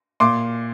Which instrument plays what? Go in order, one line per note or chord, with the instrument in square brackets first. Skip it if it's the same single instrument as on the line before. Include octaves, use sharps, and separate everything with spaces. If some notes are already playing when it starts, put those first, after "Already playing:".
[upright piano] A#2 C6 D6